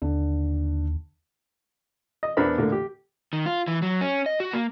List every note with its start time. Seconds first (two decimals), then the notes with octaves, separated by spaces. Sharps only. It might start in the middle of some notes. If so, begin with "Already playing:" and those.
0.02 D#2 D3
2.23 D#5
2.37 E2 B3 D4 A#4 C5 B5
2.57 A2 D3 A#3
2.72 G4
3.33 D#3
3.46 F4
3.68 E3
3.82 F#3
4.01 C#4
4.26 D#5
4.40 F#4
4.53 A#3